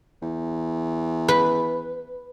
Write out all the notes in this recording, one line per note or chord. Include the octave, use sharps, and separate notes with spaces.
E2
B4